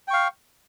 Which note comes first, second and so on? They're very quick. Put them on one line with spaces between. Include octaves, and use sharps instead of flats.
G5 C#6 F5